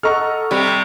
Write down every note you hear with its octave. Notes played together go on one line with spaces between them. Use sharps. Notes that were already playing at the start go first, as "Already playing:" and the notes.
A4 D#5 F#5 A#5 C#6 F6
C3 G3